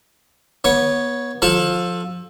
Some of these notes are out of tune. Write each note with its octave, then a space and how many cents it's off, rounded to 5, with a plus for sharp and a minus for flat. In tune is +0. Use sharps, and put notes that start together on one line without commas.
B3 -25 C#5 +0
F3 +20 A4 +0 A5 +0